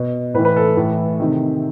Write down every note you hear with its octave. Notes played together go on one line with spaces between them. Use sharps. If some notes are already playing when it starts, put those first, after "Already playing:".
Already playing: B2
A2 E3 B4
B4
A4
A2 E3
C3 D#3